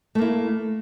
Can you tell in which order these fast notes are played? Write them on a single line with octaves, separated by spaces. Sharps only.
A3 A#3 E4